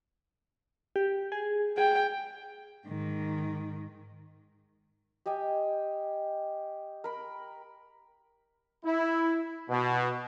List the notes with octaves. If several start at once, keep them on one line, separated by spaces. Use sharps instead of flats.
G4
G#4
G#4 G5
G#2 D#3
G4 D#5 G5 G#5
A#4 B5
E4
B2